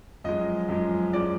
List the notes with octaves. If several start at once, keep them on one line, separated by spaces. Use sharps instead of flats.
F#2 F3 G#3 D#5
F#2 F3 G#3
F#2 F3 G#3 D5